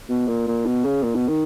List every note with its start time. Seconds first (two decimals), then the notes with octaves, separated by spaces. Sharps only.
0.09 B2
0.28 A#2
0.47 A#2
0.66 B2
0.85 C#3
1.03 A#2
1.15 B2
1.28 D#3